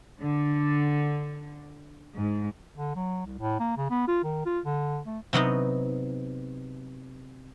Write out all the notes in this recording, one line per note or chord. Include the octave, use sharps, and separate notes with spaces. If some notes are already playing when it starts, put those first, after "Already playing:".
D3
G#2
D3
F#3
C2
A2
A#3
C#3
B3
F4
D#3
F4
D3
A3
C3 F#3 B3 D#4